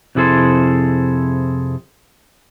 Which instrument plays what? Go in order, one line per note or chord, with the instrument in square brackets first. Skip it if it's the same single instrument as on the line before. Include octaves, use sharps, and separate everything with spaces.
[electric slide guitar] F2 C3 E4 G#4 A4 C5